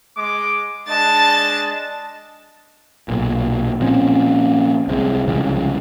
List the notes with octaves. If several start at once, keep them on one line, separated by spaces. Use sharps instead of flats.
G#3 D6
G#3 D4 D#5 A5 A6
B1 A#2
A#2 F3 C4 C#4
C2 C3 G3 G#3
C2 C#3 F3 G#3